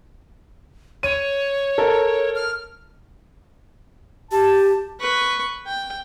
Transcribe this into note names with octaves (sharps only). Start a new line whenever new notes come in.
C#5 D#7
A4 A#4
F6
G4 A5
B4 C#6
G5